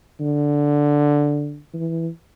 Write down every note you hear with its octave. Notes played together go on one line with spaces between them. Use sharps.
D3
E3